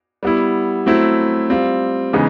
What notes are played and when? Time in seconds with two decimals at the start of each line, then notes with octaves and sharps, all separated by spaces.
0.23 G3 B3 E4
0.86 F#3 A3 C4 E4
1.50 G3 C4 F4
2.13 C#3 E3 G#3 B3 D#4